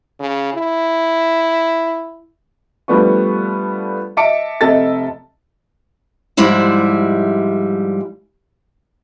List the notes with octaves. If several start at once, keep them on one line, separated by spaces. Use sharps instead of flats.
C#3
E4
F3 G3 A3 B3 D4 C#6
D#5 E5 A5 D6 C#7 D7
F1 C3 A4 D#5 E5 A6
G#2 F3 G3 G#3 E4 E5